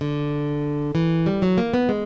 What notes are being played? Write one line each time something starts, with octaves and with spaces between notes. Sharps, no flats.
D3
E3
G3
F#3
A#3
B3
G#3